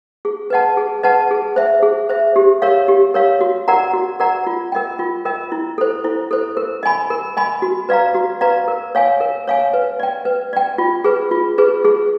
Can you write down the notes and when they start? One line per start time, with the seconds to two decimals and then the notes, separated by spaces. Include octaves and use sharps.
0.25 G#4
0.50 B4 D#5 F#5 A5
0.77 G#4
1.03 B4 D#5 F#5 A5
1.31 G#4
1.56 C5 E5
1.82 G#4
2.09 C5 E5
2.36 G4
2.62 A#4 C#5 F5
2.88 G4
3.14 A#4 C#5 F5
3.41 F#4
3.68 A#4 D5 F#5 A#5
3.93 F#4
4.20 A#4 D5 F#5 A#5
4.47 F4
4.72 A#4 D#5 G5
4.99 F4
5.25 A#4 D#5 G5
5.52 E4
5.78 A4 C5
6.04 E4
6.31 A4 C5
6.57 A#4
6.83 D#5 G#5 B5
7.10 A#4
7.37 D#5 G#5 B5
7.62 F#4
7.89 B4 D5 F5 A#5
8.15 F#4
8.41 B4 D5 F5 A#5
8.68 A#4
8.95 C#5 F5 G#5
9.20 A#4
9.47 C#5 F5 G#5
9.74 B4
10.00 D5 G5
10.25 B4
10.53 D5 G5
10.78 F4
11.04 G#4 B4
11.31 F4
11.58 G#4 B4
11.85 G#4